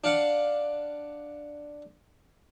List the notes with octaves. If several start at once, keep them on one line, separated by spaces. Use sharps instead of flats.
D4 F5 F#5